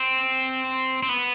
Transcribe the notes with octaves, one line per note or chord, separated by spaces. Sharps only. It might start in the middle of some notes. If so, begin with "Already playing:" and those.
Already playing: C4
C4
B3